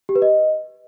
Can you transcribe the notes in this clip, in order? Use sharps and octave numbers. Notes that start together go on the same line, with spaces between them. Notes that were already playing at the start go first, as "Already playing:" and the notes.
G4
B4
D#5